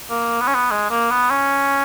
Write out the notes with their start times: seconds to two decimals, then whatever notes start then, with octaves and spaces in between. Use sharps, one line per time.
0.10 A#3
0.41 B3
0.48 C#4
0.55 B3
0.71 G#3
0.91 A#3
1.11 B3
1.31 C#4